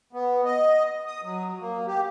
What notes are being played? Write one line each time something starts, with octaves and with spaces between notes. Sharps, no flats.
B3
D#5
D#6
F#3
A#3
G4